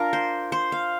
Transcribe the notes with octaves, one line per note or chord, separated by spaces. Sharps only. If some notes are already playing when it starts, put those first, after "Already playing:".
Already playing: D4 F4 A#4
C5
C5
F5